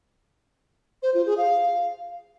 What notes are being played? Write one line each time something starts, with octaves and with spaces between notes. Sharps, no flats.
C5
F4
G#4
F5